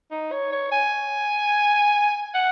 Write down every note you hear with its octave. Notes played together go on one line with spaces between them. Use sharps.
D#4
C#5
C#5
G#5
F#5